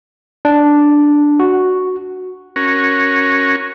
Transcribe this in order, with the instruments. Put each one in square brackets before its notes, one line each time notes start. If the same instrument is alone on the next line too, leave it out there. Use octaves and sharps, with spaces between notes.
[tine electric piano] D4
F#4
[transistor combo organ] C#4 F#4 A#4